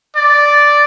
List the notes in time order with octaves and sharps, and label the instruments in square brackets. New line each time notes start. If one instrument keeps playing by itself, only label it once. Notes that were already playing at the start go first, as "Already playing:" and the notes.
[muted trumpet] D5